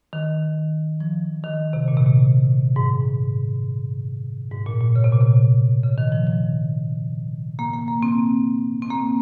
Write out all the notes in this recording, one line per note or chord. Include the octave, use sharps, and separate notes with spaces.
D#3
F3
D#3
C3
A#2
C3
A#2
G#2
G#2
A#2
A#2
C#3
C3
A#2
C3
C#3
D#3
F3
F3
A#3
A#3
A#3
C4
C4
A#3